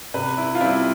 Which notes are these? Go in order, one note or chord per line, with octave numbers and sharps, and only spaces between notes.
C3 B4
E4
F4
G3 C4 E4